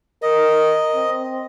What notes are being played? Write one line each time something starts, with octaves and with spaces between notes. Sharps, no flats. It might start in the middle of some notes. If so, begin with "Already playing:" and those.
A#4 D#5
C4